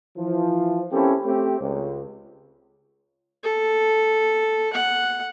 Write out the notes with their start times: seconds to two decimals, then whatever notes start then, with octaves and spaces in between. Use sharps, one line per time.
0.17 E3 F3
0.92 A#3 C4 C#4 E4 G4 A4
1.25 A3 C4 G4
1.61 C#2
3.43 A4
4.73 F#5